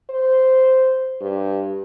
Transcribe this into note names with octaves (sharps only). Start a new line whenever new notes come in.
C5
G2